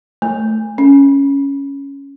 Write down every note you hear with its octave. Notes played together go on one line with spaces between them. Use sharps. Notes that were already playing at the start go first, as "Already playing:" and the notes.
A3
C#4